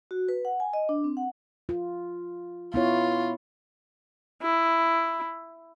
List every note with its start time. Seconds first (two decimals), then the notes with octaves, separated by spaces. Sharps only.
0.11 F#4
0.29 B4
0.45 F#5
0.60 G#5
0.73 D#5
0.89 D4
1.04 C4
1.17 F#5
1.69 F4
2.74 B3 E4 F4 C#5
4.42 E4